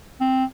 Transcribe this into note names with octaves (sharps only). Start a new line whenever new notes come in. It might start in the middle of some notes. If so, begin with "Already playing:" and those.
C4